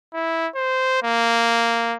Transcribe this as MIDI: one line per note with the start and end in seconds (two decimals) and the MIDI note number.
0.14 0.48 64
0.55 0.99 72
1.03 1.96 58